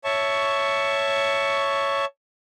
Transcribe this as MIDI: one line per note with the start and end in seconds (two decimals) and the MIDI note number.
0.04 2.05 73
0.04 2.05 76
0.04 2.05 81
0.04 2.05 85